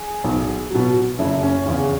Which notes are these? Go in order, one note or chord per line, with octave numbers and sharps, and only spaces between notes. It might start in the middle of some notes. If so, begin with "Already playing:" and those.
Already playing: G#4
B1
B2 F#3
F#1 E4
C#4
E2 C#3 C#4